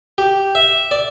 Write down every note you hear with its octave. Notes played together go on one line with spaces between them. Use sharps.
G4
E5
D5